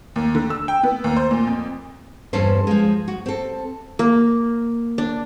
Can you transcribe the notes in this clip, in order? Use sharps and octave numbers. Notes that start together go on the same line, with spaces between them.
D#2
D3
E6
G5
B3
D#2
C5
A#2
F2
E2 G2 G3 C#4 A4 C5
F3 G#3
F#4
C4 A4
A#3
D4